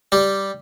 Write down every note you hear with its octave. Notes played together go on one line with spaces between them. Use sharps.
G3